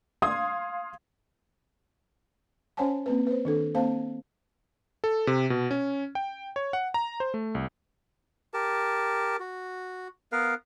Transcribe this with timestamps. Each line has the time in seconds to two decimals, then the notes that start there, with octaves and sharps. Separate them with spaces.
0.22 F5 C6 D#6 G#6
2.77 C#4 C5 C#5 F#5 G#5 A5
3.06 A#3 C4 B4
3.27 B4 C5
3.45 D#3 D4 A4
3.74 A#3 C4 C5 F5 A5
5.04 A4
5.27 C3
5.50 B2
5.71 C#4
6.15 G5
6.56 C#5
6.73 F#5
6.94 A#5
7.20 C5
7.34 A3
7.55 C2
8.54 G4 A#4 A5
9.40 F#4
10.32 B3 A#4 B4 F5